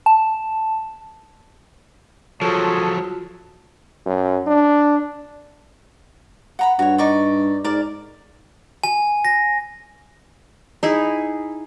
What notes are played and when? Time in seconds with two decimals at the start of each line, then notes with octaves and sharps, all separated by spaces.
0.06 A5
2.42 F3 F#3 F4 F#4 G#4 A4 C#5 A5
4.06 F#2
4.47 D4
6.59 F#5 A#5 B5
6.79 G2 F#4 C#5
6.98 D#4 D5 C#6
7.64 G#2 A#4 D5
8.84 G#5
9.25 A#6
10.83 D#4 E4 G#4